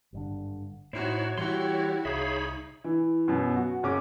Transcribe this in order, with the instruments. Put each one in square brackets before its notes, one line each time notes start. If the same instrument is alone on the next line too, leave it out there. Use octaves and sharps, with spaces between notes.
[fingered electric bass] G#1 G2 D3
[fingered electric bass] A2 [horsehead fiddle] D#4 F#4 [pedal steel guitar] E4 C5 [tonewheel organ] C#5
[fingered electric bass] E3 G3 [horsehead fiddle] E4 F#4 [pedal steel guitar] G4 C6
[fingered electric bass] C2 [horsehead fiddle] D#4 [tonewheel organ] G#4 C#5 B5 [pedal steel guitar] E5 F5
[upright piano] E3
F#2 B2
F#4
F#1 C#4 D6